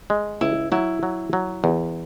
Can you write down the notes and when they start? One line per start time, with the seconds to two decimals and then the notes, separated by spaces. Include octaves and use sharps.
0.10 G#3
0.41 C#2 E4
0.72 F#3 E4
1.03 F#3
1.33 F#3
1.64 E2